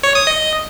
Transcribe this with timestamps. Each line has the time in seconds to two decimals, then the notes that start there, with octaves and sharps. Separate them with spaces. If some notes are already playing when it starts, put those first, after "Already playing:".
0.03 C#5
0.15 D#6
0.27 D#5